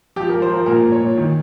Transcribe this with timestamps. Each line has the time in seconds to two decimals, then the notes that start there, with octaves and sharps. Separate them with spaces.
0.16 F3 G4
0.29 A#4
0.34 F3
0.42 C5
0.50 F3 A#4
0.66 A#2 A#4
0.84 A#2
0.92 C#5
1.01 A#2
1.18 D#3